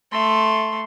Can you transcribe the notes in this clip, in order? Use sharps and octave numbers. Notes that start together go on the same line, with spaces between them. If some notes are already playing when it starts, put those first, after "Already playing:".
A3 C6